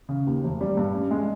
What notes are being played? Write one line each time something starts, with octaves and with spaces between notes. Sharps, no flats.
C#3
D#2
F1
G3
G2
C#4
G#3